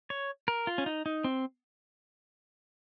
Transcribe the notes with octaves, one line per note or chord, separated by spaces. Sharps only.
C#5
A#4
F4
C#4
D#4
D#4
C4